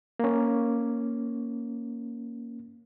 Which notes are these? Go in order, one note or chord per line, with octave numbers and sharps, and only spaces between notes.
A#3 C#4